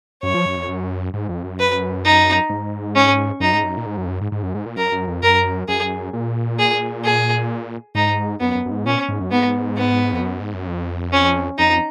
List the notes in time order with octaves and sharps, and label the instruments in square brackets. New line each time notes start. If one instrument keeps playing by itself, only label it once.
[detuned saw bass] F#2 [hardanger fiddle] C#5
[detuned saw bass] F3
F#2
F2
F#2
G#2
F2
F#2
[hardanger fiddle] B4
D#4
[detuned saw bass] G#2
[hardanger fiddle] C#4
[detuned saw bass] F#2 [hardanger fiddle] D#4
[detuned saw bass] G#2
F#2
A#2
G#2
F#2
F2
F#2
G#2
G#2
F#2
G#2
A#2
[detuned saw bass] F#2 [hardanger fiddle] A#4
[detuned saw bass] F#2
F2
[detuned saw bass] F#2 [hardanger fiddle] A#4
[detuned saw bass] F#2 [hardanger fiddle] G#4
[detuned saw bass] A#2
[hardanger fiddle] G#4
G#4
[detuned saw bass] G#2 [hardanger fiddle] D#4
[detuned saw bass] F#2 [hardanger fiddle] B3
[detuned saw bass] F#2
F#2
G#2
[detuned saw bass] A#2 [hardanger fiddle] C#4
[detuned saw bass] G#2
F#2
[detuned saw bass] G#2 [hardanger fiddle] B3
[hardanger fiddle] B3
[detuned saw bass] F2
F#2
G#2
F#2
F2
[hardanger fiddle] C#4
[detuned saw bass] F2 [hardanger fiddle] D#4